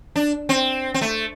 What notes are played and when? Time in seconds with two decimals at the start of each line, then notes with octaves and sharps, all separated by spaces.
0.16 D4
0.49 C4
0.94 C4
1.01 A3